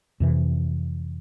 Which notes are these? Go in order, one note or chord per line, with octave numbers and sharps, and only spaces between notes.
F2 C3 E3